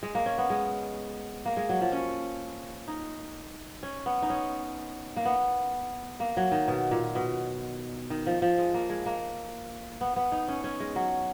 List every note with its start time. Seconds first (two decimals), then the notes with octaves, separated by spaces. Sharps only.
0.03 G#3
0.15 A#3
0.26 C#4
0.38 B3
0.50 G#3
1.46 A#3
1.57 G#3
1.69 F#3
1.81 F3
1.92 C#4
2.88 D#4
3.83 C#4
4.06 B3
4.22 D#4
4.30 C#4
5.16 A#3
5.25 B3
6.20 A#3
6.37 F#3
6.52 D#3
6.68 B2
6.91 A#2
7.15 B2
8.10 D#3
8.26 F3
8.42 F3
8.58 G#3
8.74 A#3
8.90 G#3
9.06 A#3
10.01 B3
10.16 B3
10.32 D#4
10.48 C#4
10.64 C#4
10.80 G#3
10.96 F#3